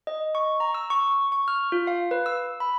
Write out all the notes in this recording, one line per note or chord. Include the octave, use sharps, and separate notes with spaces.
D#5
C#6
A#5
E6
C#6
C#6
F6
F4
F5
B4
E6
B5